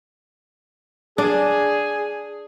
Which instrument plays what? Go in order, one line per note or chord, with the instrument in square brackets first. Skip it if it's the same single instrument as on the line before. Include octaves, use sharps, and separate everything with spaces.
[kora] D4 [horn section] G#4